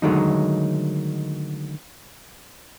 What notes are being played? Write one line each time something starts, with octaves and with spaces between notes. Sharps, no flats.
D3 D#3 F#3 G#3 A3 D#4